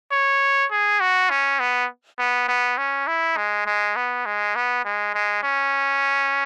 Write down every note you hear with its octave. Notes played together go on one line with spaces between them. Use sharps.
C#5
G#4
F#4
C#4
B3
B3
B3
C#4
E4
G#3
G#3
B3
G#3
B3
G#3
G#3
C#4